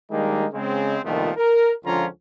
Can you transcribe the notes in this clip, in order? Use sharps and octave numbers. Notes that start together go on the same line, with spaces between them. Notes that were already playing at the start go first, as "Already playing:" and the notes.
D#3 G3 G#3 A#3 D4 D#4
C#3 G#3 C4
C2 A#2 D#3 F3 A3 B3
A#4
C#2 D3 F3 C#4 F4 A#5